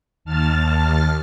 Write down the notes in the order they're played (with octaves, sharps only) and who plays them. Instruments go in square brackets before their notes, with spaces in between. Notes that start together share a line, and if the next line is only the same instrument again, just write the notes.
[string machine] D#2 A5 F6 A6